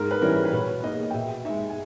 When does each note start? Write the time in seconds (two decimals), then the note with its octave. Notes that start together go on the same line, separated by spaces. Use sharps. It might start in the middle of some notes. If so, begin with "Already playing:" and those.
Already playing: G#2 A#4
0.11 B4
0.21 E3 G3 C#4 A#4
0.45 B4
0.53 B2 C#5
0.83 A#3 D#4 D#5
1.10 G5
1.14 B2 E5
1.45 G#3 D#4 E5
1.69 G#5